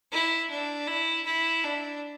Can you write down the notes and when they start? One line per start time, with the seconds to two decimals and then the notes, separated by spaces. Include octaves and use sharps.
0.12 E4
0.50 D4
0.87 E4
1.26 E4
1.64 D4